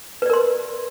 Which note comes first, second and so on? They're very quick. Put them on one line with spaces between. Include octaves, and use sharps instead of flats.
B4 D5 A#4 C6